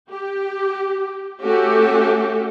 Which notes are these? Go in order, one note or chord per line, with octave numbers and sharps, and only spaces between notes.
G4
A3 C#4 F#4 G4 A4